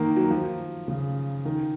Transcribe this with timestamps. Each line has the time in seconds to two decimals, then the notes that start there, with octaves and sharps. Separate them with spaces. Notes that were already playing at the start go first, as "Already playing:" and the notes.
Already playing: D#3 A#3
0.16 F#3
0.30 F3
0.88 C#3
1.45 D#3